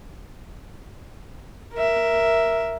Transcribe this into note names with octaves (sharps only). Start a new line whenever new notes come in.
A#4 E5